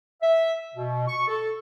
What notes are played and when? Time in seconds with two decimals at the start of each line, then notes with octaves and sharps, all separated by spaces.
0.22 E5
0.75 B2
1.08 C#6
1.27 A4